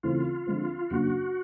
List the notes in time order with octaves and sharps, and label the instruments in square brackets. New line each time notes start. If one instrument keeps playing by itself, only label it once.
[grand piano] C#3 E3 A3 C4 [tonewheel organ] F4
[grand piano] D3 F3 G#3 C4
[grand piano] F#2 C#3 F#3 A#3 D4 [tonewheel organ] F#4